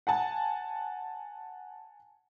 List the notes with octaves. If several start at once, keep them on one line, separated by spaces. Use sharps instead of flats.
F#5 G#5 A5